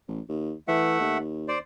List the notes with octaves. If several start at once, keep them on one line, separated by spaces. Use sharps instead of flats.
A1
D#2
E3 A3 E5 F#5
D#2
C5 D5